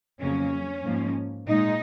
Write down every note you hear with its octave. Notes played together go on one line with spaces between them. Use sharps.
F2 C#3 F#3 A#3 C#4
G#2 F3 A#3
A#2 G#3 D#4